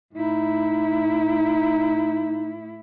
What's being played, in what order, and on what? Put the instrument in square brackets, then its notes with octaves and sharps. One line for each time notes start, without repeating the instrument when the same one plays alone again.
[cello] A2 E4 [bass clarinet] D#4